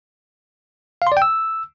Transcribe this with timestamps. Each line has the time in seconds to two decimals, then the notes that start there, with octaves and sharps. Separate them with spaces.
1.02 F5
1.07 C6
1.12 D5
1.17 G5
1.22 E6